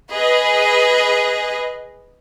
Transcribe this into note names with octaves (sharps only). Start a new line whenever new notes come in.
G#4 B4 D#5